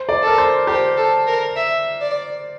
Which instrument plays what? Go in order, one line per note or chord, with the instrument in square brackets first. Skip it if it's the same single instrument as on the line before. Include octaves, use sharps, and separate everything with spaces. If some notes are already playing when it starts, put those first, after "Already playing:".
Already playing: [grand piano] C5
D5
[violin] A4 [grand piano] A#4
[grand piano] C5
[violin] G4 [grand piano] C5
[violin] A4
A#4
E5
D5